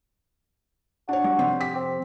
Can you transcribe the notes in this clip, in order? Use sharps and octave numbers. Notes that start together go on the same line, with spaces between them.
D4 F#4 C#5
G2
F2 C3
G4 B6
C4